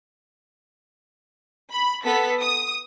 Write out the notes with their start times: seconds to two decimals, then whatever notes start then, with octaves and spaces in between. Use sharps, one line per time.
1.71 B5
2.05 B3 A4 B6
2.41 D#6